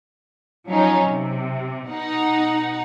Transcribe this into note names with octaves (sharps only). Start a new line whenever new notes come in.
F3 F#3 C#4 D#4
C3
B2 D#4 F#5